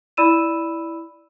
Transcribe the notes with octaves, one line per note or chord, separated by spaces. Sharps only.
E4 D5 B5 E6 D#7 E7